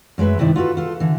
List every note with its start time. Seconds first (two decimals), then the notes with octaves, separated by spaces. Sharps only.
0.18 F#2 G#3 A3 B4 E5
0.39 G2 C3 D#3 E4 D5
0.56 F4 F#4 A4 B4
0.77 F4 A4
1.00 D3 E3